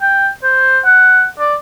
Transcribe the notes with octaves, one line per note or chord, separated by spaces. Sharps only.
G5
C5
F#5
D5